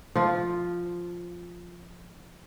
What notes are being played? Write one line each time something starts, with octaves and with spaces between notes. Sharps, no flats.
F3 F4